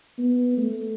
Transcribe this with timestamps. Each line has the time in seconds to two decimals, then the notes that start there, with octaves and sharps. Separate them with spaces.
0.18 B3
0.58 A3